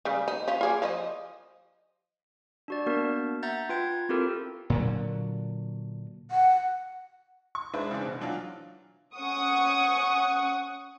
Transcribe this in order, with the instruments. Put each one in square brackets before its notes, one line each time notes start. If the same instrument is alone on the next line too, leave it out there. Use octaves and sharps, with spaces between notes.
[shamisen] C#3 G3 G#4
D#4
C#4 F4
F4 G#4 D5
F3 D5 D#5
[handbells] D4 F#4 D5
A#3 B3 D4 F#4 A#4
E5 F#5 A#5 G6 A6
F4 B4 G5 G#6
C4 E4 F4 G4 A4 A#4
[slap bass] A#2 D3 F#3
[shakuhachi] F#5
[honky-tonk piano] C#6
G#3 D4 E4 B4 C5 E5
C#3 E3 C4 D4
B2
E3 F#3 D4 F4
[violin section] C#4 F#5 C#6 D#6